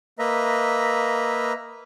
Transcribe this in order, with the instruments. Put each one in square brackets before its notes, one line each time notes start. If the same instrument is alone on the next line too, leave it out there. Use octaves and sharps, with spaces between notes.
[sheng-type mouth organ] A#3 B4 D#5 E5 A#5